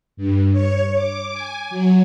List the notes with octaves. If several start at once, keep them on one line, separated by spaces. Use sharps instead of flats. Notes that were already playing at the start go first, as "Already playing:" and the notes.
G2
C#5
D6
G#5
F#3